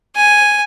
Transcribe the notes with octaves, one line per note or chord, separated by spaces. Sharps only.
G#5